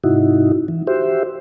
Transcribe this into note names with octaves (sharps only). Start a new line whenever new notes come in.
G#2 C3 D#4 E4 F#4
E3
F#4 G4 C5 E5